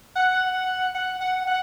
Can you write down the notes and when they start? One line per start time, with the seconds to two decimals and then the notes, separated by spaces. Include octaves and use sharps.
0.15 F#5
0.95 F#5
1.21 F#5
1.47 F#5